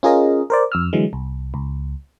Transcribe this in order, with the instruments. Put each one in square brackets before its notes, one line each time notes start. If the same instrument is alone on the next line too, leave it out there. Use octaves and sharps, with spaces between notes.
[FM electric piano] C#4 F4 G#4 A#4 D#5
A#4 C5 D5
F2 E6 F6
D3 E3 F#3 G#3
C2
C#2